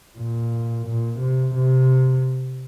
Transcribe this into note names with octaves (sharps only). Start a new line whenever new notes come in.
A#2
A#2
C3
C3